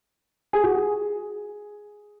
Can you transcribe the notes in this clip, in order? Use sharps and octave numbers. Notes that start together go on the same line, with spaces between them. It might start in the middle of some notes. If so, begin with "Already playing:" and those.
G#4
F#4
G#4